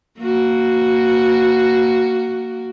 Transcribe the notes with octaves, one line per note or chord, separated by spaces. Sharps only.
A#3 F#4